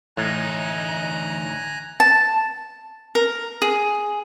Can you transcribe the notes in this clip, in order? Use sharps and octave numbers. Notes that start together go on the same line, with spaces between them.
D2 A2 E3 D#4 G#5 A#5 F#6
A5
A#4
G#4